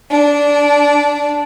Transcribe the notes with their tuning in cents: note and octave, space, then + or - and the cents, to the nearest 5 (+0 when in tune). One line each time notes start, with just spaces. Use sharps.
D4 -15